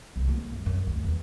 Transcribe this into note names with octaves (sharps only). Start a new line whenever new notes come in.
C2
A#3
F#2
F#2
D2
E2